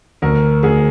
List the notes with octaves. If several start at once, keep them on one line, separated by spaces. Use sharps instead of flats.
D2 A#4
D2 G#4